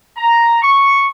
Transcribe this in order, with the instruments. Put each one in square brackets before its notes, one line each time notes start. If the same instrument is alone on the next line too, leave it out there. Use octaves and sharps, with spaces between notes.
[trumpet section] A#5
C#6